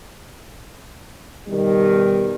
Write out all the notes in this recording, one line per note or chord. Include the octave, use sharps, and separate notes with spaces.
B2 D#3 G3